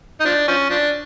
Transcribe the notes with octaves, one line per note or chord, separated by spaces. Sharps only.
D#4
F3 D4
F3 C#4
F3 D4